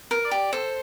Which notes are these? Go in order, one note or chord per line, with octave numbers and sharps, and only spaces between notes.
A#4
D5
G4
A4 C5